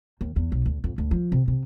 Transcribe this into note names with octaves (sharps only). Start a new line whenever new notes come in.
D#2
E2
B1
D2
F2
D2
F3
C3
C3